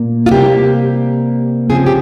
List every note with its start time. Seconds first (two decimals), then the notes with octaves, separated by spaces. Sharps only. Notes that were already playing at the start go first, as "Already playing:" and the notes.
Already playing: A#2 A#3
0.26 F4
0.31 C3 G3 A#3 G4
1.70 C#3 F3 C4 G#4
1.86 G4